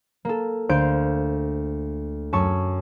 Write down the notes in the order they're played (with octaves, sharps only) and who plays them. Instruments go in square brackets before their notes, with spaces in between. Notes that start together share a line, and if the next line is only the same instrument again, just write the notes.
[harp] A#3 A4
D2 C5 F5 G6 D7
F#2 A5 C#6 E6